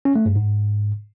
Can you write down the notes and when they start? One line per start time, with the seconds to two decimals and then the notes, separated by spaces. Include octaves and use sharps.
0.05 C#4
0.15 A3
0.26 G2
0.36 G#2